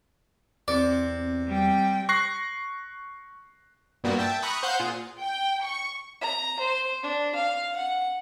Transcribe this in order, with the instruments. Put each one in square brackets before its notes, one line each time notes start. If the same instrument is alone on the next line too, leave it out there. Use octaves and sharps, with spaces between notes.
[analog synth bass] E2 [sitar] C3 [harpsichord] D5
[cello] G3 G5
[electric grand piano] C#6 F#6 A#6 C7
[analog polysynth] G2 A#2 G3 A#3 B3 F#4
E5 G5 A5
A#5 B5 C#6 D#6 F#6
C5 F5 F#5 G6
A#2 F4 G#4
[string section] G5
C#6
[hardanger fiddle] A#5
C5
D4
F5
F#5